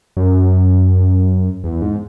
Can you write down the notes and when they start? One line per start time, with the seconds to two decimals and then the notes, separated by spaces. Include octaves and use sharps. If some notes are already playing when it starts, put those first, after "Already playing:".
0.17 F#2
1.64 E2
1.82 G#2